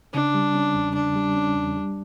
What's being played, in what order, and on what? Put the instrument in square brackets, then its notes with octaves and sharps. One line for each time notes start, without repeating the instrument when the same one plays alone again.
[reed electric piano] C#3 [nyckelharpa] D4
[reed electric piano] G3
C#4
E2
[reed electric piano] C#3 [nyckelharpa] D4
[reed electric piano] G3
C#4
E2
G3